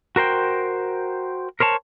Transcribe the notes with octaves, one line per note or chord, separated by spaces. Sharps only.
F#4 A#4 C5 G5
A#4 C5 C#5 A5